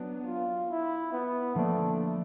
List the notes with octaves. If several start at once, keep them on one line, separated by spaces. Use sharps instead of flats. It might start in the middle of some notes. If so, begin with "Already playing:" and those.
Already playing: F#3 B3 D4
F4
E4
B3
D3 F3 A3 A#3 D4